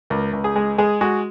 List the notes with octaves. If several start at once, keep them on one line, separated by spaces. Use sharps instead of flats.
C#2 A#4
C#2
G#4
G#3
G#3 G#4
G#3 F#4